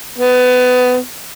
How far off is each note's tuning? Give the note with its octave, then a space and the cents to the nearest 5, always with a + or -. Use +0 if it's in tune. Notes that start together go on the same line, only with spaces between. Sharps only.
B3 +20